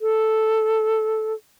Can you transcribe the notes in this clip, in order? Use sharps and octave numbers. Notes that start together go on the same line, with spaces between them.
A4